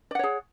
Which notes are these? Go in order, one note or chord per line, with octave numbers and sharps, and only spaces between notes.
G#4 C#5 D5 F#5